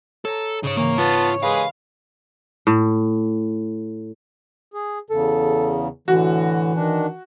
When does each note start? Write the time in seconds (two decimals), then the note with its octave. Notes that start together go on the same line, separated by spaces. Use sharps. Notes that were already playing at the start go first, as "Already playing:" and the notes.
0.25 A4 C#5 A#5
0.63 G#2 C#3 C#5 D#6
0.77 C#3 E3 A#3 C#5
0.98 B3 F4 A5
1.43 G#3 G4 G#4 A#4 B4 F5 B5
2.67 A2
4.74 G#4
5.10 E2 C#3 A4
6.08 A2 D3 E3 F#4
6.75 D#3 D4